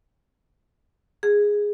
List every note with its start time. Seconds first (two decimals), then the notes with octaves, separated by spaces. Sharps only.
1.23 G#4